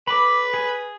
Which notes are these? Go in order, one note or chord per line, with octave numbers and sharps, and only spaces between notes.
B4 B5 D6
G#4